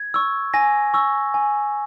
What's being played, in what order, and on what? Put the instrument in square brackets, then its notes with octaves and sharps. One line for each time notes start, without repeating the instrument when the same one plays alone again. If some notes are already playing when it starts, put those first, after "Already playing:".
Already playing: [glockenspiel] G#6
C#6 E6
G#5 A#6
C#6 E6
G#5